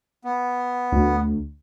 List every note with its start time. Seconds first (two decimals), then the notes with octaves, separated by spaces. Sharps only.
0.24 B3
0.92 D2